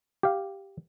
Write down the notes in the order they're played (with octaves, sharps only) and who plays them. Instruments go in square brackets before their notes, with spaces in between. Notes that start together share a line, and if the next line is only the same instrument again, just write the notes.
[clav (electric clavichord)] G4 F5